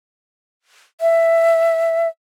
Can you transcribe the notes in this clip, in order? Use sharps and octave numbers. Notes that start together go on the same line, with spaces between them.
E5